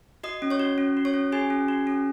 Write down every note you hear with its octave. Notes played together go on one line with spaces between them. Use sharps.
F#4 D#5 D#6
C#4
C#5 C#6
F#4
C#4
F#4
C#5 C#6
C#4
F#4 G#4 G#5
C#4
F#4
C#4